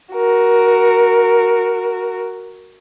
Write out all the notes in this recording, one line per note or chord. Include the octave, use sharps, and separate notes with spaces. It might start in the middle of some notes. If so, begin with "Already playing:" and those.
F#4 A#4